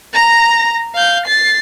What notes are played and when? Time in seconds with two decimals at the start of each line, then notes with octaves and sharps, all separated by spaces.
0.13 A#5 A#6
0.95 F5 G6
1.26 A6 C7